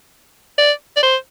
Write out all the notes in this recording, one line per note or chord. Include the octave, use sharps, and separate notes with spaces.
D5
D5
C5